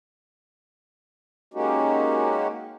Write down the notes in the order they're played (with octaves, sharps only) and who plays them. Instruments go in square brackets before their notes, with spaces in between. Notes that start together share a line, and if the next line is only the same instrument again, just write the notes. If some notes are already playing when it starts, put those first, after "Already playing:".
[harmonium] G#3 A#3 C#4 D#4 F#4 G4